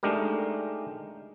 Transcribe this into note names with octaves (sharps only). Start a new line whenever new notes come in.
G#3 A3 D4 D#4 G4 A#4